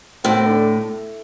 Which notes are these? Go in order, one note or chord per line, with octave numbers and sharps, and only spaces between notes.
A2 C4
D3